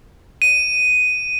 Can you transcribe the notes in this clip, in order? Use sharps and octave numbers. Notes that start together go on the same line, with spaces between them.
D#7